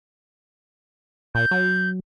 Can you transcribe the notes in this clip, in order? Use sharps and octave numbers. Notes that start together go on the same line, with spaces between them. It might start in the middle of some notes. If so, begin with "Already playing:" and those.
A#2 G6
F#3